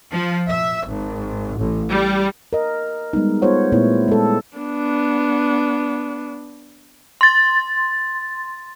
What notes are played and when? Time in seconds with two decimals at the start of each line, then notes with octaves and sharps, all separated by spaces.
0.11 F3
0.48 E5
0.85 G#1
1.58 A1
1.90 G3
2.53 A#4 D#5
3.13 G3 G#3 B3 D#4
3.42 B3 F4 G#4 C5 C#5 F#5
3.72 A#2 A3 B3 E4 C#5
4.08 G#3 A4
4.57 B3 D4
7.21 C6 A6